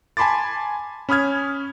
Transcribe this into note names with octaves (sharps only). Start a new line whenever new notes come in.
G#5 A5 B5 C6 D6 A6
C#4 B5 D#6 F6 G#6